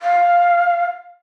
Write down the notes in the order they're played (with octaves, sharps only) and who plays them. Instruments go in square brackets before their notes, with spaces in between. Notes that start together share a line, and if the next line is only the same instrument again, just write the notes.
[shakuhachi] F5